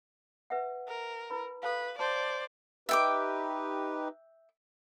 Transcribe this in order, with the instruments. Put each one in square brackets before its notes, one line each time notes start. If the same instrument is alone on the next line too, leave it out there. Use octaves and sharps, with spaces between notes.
[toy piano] B4 E5 F#5
[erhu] A#4
[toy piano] E4 B4 B5
[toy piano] A4 F5 [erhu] B4
[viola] C5 [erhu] D5 [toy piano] A5
[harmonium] D#4 G4 B4 [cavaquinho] E5 G5 D6